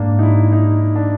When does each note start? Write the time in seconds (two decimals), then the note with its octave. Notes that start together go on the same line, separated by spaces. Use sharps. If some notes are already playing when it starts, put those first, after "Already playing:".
Already playing: G#2 A#3 D4
0.19 D#4
0.23 E4
0.52 D#4
0.96 D4